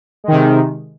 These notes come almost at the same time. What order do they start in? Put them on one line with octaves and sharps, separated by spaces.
G#3 D#3 C3